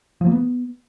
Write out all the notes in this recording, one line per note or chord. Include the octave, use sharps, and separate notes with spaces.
F3
A#3
B3